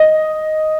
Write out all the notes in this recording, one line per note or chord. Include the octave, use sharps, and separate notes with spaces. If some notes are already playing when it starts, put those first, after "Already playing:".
Already playing: D#5